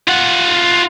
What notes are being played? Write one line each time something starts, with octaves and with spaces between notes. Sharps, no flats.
F4 F#5